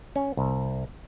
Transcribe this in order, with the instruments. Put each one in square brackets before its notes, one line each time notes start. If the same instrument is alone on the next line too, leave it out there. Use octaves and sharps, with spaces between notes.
[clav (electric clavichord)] C#4
C2